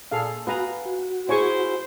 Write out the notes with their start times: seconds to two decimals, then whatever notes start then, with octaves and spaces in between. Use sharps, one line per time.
0.11 A#2 G#4 A4 F5
0.47 B3 F#4 B4 F5 G#5 A#5
0.86 F#4
1.29 E4 G#4 C5 C#5 G#5 C#6